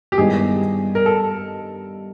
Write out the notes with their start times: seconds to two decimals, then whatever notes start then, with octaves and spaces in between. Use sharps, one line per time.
0.12 G4
0.18 G2 D#3 G#3 B3 E4 G#4
0.95 A#4
1.06 A4